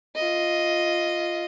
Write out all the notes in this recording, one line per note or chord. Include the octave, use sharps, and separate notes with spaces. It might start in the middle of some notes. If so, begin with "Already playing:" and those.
F4 D#5